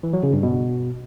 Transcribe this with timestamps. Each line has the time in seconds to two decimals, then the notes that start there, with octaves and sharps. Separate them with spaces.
0.03 E3
0.13 F#3
0.23 C#3
0.33 G2
0.43 B2